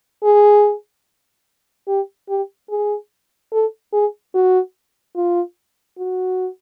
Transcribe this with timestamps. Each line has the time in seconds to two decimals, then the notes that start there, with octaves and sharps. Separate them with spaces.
0.24 G#4
1.88 G4
2.29 G4
2.70 G#4
3.52 A4
3.93 G#4
4.34 F#4
5.16 F4
5.98 F#4